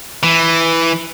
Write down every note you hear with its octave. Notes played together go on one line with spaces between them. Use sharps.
E3